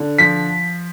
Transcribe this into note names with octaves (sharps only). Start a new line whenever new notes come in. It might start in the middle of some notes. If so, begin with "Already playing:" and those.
Already playing: D3
F3 B6